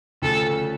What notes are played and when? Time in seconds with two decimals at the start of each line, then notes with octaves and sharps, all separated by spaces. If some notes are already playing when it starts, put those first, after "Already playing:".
0.22 D2 C#3 F3 A4